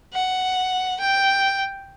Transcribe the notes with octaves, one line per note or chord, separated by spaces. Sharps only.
F#5
G5